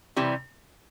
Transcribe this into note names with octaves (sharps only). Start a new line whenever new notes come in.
C3 E3 G3